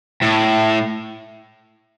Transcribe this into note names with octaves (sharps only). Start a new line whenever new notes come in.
A2